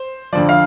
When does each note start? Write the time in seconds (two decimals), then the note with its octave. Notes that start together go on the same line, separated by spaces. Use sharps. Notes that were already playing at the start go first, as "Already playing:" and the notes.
Already playing: C5
0.33 F2 D3 F3 D5
0.49 F5